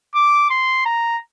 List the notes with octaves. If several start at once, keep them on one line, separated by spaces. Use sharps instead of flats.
D6
C6
A#5